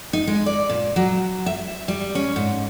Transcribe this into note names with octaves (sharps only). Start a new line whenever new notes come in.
D#4
G#3
D5
A#2
F#3
E5
G3
C#4
G#2